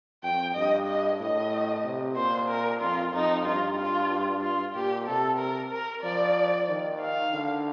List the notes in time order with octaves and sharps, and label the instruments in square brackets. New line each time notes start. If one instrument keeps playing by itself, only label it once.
[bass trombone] F2 [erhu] G5
[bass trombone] G2 [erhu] D#5
[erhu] D#5
[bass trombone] A2 [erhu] D#5
[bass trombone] C3
[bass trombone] A#2 [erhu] C5
[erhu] A#4
[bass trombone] F2 [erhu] F4
[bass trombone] F2 [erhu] D#4
[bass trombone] G2 [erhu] F4
[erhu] F4
F4
[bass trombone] A#2 [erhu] G4
[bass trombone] C3 [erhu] A4
[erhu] A#4
A#4
[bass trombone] F3 [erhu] D5
[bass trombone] D#3
[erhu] F5
[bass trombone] D3